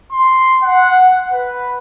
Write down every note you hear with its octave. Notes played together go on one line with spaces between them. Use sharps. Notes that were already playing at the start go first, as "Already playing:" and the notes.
C6
F#5
B4